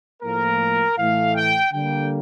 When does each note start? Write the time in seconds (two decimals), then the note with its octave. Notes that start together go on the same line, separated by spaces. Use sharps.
0.23 A2 F3 A#3 A#4
0.97 A2 E3 A3 F5
1.35 G5
1.72 D3 G3 A#3 G5